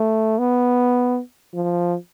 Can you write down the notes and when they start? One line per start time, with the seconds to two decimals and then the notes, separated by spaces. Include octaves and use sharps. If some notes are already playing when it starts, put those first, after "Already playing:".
Already playing: A3
0.38 B3
1.54 F3